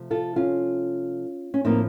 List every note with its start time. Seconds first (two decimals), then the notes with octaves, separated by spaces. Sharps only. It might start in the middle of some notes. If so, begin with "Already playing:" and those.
Already playing: C3 F3 A3
0.11 F4 A4
0.36 C#4 F4
1.54 C#4
1.65 A2 F3 A#3 C4 D#4